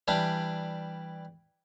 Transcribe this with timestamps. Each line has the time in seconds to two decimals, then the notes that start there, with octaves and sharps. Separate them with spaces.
0.08 E3 G3 D4